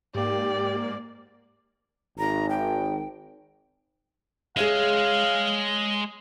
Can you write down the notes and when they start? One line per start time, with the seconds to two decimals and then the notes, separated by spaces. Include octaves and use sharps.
0.15 G#2 A#3 G4 D5
2.18 G#1 A#5
2.49 G5
4.57 G#3 G#4 C#5 E5 F5